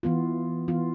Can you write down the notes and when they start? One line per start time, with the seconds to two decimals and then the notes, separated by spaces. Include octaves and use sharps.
0.03 E3 B3 F4
0.68 E3 B3 F4